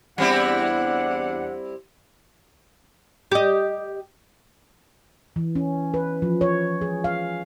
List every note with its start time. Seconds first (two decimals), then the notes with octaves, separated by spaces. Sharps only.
0.18 E2 G3 C4 D4 E4 F#5
3.32 G4 D#5
5.36 E3
5.56 C#4
5.94 B4
6.22 F3
6.41 C#5
6.81 G#4
7.04 F5